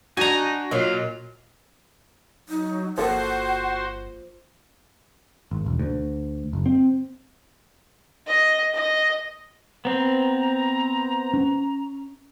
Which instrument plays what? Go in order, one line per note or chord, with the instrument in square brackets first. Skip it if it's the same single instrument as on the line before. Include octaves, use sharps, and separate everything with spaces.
[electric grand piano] D4 F#4 [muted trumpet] D#4 [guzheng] G#5 A#5
[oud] A#2 F#3 [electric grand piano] D#5 [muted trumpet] F5
[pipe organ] F#3 [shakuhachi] D#4
[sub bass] G1 [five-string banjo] F3 A#3 A4 [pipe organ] F#4 C5 [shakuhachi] F#5
[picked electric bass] G#1
E1
D2
F#1
C4
[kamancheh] D#5
D#5
[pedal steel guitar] B3 C4 [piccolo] A#5
[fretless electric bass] C#4